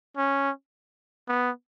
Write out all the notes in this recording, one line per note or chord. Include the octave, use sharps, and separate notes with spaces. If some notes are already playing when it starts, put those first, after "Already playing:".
C#4
B3